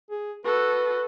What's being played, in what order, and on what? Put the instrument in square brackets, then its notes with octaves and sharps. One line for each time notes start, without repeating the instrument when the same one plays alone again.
[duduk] G#4
[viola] F#4 A4 [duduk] B4